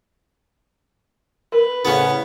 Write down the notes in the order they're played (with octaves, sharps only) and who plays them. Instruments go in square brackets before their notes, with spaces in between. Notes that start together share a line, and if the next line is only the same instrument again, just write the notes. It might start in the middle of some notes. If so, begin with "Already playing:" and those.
[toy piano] A#4 [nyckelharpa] B4
[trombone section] A2 C#3 [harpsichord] B3 C#4 [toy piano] E4 G#4 C5